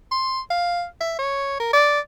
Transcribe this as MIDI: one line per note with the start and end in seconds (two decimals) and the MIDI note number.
0.11 0.41 84
0.50 0.85 77
1.01 1.16 76
1.19 1.58 73
1.60 1.72 70
1.73 2.00 74